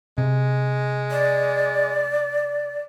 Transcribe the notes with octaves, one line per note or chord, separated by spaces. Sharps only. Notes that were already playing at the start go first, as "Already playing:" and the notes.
C3 G#3
D5